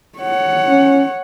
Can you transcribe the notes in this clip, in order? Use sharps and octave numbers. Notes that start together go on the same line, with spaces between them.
C#5 F#5
C#4